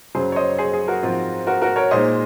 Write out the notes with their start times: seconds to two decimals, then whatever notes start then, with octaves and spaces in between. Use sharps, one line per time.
0.15 F#2 C#3 F#3 G#4 C5
0.32 C#5
0.36 C5 D#5
0.58 G#4 C5
0.73 G#4
0.88 F#4 A#4
1.03 G#2 F3 C4 F4
1.47 F#4 A#4
1.62 F#4 A#4
1.76 A#4 C#5
1.91 A#2 G#3 D#4 C5 D#5